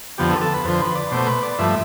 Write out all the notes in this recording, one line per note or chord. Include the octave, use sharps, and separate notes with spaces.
F2 D3 F3 B3 G4
A4
A4
B4
F2 D3 F3 C5
B4
D5
B2 A3 C5
B4
D5
G2 F3 A3 E5